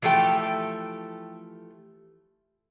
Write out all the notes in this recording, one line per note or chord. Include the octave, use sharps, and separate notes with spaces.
E3 F3 A3 G4 G5